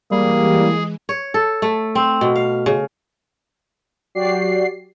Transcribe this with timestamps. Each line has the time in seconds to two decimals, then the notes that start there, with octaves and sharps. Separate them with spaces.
0.11 E3 G3 G#3 A#3 G#4
1.09 C#5
1.34 A4
1.62 A3
1.95 C4
2.21 B2
2.36 F5
2.66 C#3
4.15 F#3 F#4 G4 D5 C7